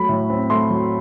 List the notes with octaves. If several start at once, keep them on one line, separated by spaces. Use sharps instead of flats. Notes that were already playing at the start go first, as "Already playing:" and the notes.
Already playing: F#3 A3 B5
A2
C4
A3 C6
F#3